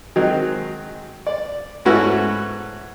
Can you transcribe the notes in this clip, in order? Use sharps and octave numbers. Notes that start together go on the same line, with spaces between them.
D#3 F#3 G#3 C4
D5
G#2 A3 B3 C#4 E4 F#4